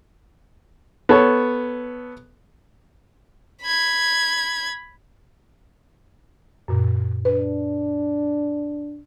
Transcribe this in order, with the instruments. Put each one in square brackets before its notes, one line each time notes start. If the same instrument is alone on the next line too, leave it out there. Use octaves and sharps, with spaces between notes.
[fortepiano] B3 A4 C#5
[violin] B5 G#6
[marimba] F#2 A#2
[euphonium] D4 [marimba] B4